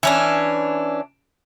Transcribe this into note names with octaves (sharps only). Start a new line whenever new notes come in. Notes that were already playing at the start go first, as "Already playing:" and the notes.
E3 C#4 D4